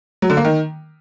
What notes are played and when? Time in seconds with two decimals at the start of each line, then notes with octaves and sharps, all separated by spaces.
0.22 F#3
0.30 D3
0.37 A#3
0.45 D#3